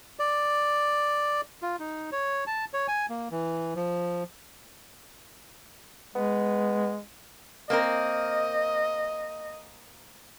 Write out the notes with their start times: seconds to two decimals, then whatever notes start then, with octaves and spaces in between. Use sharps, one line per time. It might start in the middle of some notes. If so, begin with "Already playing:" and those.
0.19 D5
1.62 F4
1.79 D#4
2.12 C#5
2.47 A5
2.74 C#5
2.88 G#5
3.10 A#3
3.31 E3
3.76 F3
6.15 G#3 B3
7.70 A#3 C4 A#4 D#5